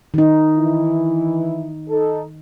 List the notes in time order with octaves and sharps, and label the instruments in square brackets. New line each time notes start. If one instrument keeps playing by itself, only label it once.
[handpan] D#3 D#4
[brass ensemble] E3 E4
D#4 A4